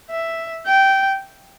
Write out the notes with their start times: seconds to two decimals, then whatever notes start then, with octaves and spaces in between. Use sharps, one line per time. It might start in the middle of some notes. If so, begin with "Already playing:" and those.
0.10 E5
0.66 G5